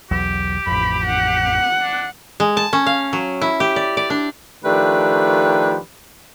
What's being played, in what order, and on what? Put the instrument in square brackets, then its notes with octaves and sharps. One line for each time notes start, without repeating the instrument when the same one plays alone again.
[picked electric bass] B1 E2 F#3 [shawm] G4
[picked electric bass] A1 F2 [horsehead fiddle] B5
[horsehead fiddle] F#5
[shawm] D4
[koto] G#3
A5
C#4
F5
F#3
E4
G4
D5
D5
D4
[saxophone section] D#3 F3 A3 D4 G4 B4